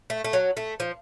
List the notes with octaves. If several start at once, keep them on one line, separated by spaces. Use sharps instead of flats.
A3
A3
F#3
A3
F3